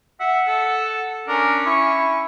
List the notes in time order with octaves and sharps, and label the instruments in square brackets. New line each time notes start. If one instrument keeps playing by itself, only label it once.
[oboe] E5 [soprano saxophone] F#5
[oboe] A4
[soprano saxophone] C#4 [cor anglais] D4 [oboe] A#4
[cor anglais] E4 [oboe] C#6